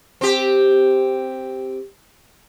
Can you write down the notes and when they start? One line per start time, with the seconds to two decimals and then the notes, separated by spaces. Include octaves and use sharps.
0.21 C4 G4